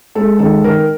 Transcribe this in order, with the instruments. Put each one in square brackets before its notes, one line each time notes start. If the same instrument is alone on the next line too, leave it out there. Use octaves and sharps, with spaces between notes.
[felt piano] G#3 A4
D#3 A4
D#3 A#4